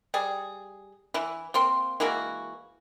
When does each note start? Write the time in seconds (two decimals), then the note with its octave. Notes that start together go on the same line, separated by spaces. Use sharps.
0.14 G3 G#4
1.14 E3 E4
1.54 A#3 C4 C6
2.00 E3 G#3 A#3 F#4